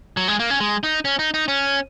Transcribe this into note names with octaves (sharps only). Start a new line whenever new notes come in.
F#3
G#3
A#3
C#4
G#3
D#4
C#4
D#4
D#4
C#4